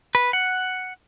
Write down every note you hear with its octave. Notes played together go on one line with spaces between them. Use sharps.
B4
F#5